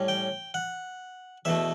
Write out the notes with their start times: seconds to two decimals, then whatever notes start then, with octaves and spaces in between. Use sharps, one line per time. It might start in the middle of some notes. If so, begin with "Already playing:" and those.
Already playing: A2 G3 C#4
0.08 G5
0.54 F#5
1.45 E2 B2 A3 E5